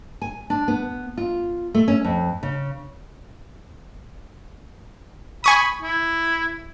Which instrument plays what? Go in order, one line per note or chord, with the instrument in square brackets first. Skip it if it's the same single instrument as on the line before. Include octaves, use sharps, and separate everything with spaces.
[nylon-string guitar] G#5
D4
B3
F4
A3
C#4
F2
C#3
[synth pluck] G#5 C#6 D#6 [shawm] B5
[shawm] E4